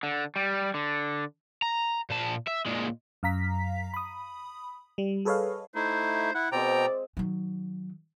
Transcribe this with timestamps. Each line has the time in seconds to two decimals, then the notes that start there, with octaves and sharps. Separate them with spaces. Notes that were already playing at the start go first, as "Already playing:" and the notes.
0.03 D3
0.36 G3
0.74 D3
1.62 A#5
2.10 A#2 A5
2.47 E5
2.66 A#2 G#3
3.23 F#2 F5 A#5 B6
3.94 B5 D#6
4.98 G3
5.25 G#4 A4 B4 C#5 D#5 F5
5.75 A3 D#4 E4 C5
6.35 E4 F#5
6.52 B2 G#3 C4 D5 G5 A#5
7.17 D#3 F#3